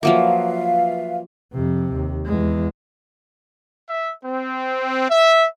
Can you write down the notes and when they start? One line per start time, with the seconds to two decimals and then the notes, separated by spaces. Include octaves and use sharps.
0.03 F3 F#3 A#3 B4 E5 F5
1.53 F2 C3
1.93 D#2
2.26 E2 G#3
3.89 E5
4.24 C4
5.10 E5